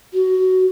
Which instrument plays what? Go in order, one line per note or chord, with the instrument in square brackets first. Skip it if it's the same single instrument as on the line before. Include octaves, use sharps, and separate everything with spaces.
[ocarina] F#4